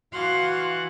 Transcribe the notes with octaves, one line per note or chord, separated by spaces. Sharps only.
E3 F#4 F5 F#5 C6